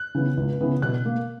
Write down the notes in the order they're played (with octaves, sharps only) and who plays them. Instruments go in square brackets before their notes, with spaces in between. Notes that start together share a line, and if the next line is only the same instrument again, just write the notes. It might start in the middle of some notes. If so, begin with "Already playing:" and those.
Already playing: [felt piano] F#6
C#3 E3 B3
C#2
C#3 E3 B3
B2 F#6
A#3